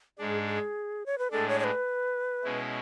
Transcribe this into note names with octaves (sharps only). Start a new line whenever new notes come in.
G#2 G#3 D4 G#4
G#4
C#5
B4
A2 G#3 D4 A4
C#5
C#5
B4
B2 G#3 C#4 E4